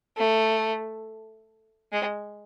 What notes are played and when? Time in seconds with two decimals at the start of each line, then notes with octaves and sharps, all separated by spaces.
0.18 A3
1.93 G#3